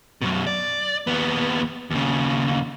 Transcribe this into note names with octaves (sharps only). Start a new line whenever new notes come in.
F#2 B2
D5
D#2 B3
D#2 C#3